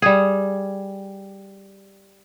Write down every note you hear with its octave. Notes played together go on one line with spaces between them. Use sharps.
G3 G#4